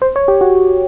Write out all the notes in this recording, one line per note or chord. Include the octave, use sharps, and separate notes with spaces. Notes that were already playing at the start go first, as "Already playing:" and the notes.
C5
C#5
G4
F#4